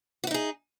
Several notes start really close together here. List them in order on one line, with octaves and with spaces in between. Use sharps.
F#4 E4 D#4 G#4